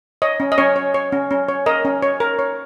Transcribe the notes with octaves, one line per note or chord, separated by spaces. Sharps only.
C#5 D#5
C#4
D#5
C#4 C#5
C#5
C#5
C#4
C#4
C#5
A#4 D#5
C#4
C#5
A#4
C#5